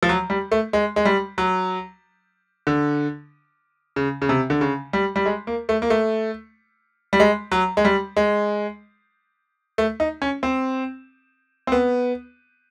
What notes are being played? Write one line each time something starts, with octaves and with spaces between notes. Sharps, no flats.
F3
F#3
G3
A3
G#3
G#3
G3
F#3
D3
C#3
C#3
C3
D3
C#3
G3
G3
G#3
A#3
A3
A#3
A3
G3
G#3
F#3
G#3
G3
G#3
A3
D#4
C#4
C4
C4
B3